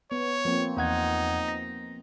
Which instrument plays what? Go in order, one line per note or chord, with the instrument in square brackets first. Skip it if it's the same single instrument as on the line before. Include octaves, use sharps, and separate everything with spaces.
[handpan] B3 [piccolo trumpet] C#5
[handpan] F3 A#3 C4
[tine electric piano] E2 F#5 G#6 [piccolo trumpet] D#4
[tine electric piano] A#6